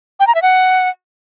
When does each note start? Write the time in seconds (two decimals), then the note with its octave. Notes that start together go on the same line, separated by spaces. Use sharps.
0.20 G5
0.27 A#5
0.35 E5
0.42 F#5